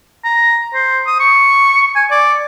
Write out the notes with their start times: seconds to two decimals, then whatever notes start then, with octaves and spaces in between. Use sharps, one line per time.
0.24 A#5
0.74 C5
1.06 D#6
1.20 C#6
1.95 G#5
2.11 D5